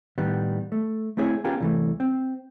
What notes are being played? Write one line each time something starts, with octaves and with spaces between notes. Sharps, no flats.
A2 D#3 G3 B3
A3
A3 C4 E4 G#4 C#5
B3 C#4 F4 G4 G#4 A#4
C2 E3 A3
C4